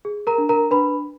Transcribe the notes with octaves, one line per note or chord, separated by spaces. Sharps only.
G#4
A#4 A#5
D4
A#4 A#5
D4 B4 B5